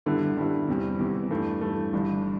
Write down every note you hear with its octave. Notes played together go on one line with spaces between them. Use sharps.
G2 D3 G3 B3 E4
G2 D3 G3 B3 E4
E2 C3 E3 G3
E2 C3 E3 G3
G2 E3 A3
G2 E3 A3
G1 G2 E3